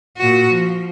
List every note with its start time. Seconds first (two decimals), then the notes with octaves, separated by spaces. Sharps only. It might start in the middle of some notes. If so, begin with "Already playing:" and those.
0.17 A#2 F#4
0.51 F3